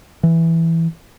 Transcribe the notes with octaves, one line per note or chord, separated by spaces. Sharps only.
E3